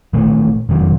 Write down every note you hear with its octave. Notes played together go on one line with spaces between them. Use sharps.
A#2 D#3 E3 A3
F1 F#2 D#3 F#3